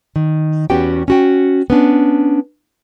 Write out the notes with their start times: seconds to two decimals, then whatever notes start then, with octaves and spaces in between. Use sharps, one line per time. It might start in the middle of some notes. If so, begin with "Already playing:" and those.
0.16 D#3
0.70 E2 B3 C#4 F#4 G4 G5
1.08 C#4 F#4 G5
1.70 B3 C#4 D4